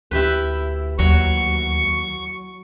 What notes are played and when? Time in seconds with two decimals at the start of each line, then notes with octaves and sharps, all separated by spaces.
0.11 D2 E4 G4 B4
0.99 D#2 F#3 C#6